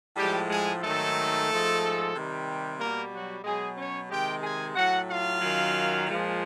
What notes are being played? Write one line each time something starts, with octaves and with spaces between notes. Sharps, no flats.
A2 F3 G3 G#3 G4
G#3 G#4
G#2 D#3 F#3 A3 A4
G#2 F3 G#3
C3 D#3 G3
B2 G3 A#3 A#4
F#3 F#4
B2 F#3 G#3 G#4
C#4 C#5
C3 D#3 G#3 G4 G5
G#4 G#5
A2 F#3 F#4 F#5
F4 F5
F#2 D#3 F#3
A#2 F3 G#3